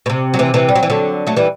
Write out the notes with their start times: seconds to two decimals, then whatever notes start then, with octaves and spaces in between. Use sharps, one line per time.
0.06 B2
0.10 C3
0.34 F#3
0.39 C3 E3
0.54 C3 E3
0.69 G3
0.75 F#3
0.83 E3
0.90 D3 F#3
1.27 F#3 A3
1.36 E3 G3